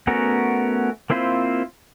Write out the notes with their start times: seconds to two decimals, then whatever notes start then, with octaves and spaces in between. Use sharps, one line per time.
0.07 A3 B3 C#4 F#4 A#4
1.10 A#3 C4 E4 F4 C5